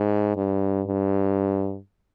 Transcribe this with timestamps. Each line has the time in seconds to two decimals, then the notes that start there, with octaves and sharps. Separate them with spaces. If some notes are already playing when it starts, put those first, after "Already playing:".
Already playing: G#2
0.36 G2
0.87 G2